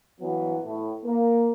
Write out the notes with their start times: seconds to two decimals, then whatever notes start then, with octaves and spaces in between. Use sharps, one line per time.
0.20 G2 E3 F#3 B3
0.64 A2
1.05 A#3